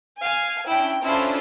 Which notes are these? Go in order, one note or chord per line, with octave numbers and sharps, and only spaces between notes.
F5 G#5
C#4 D4 E4 G5
C#4 D4 E4 F4 A4 C5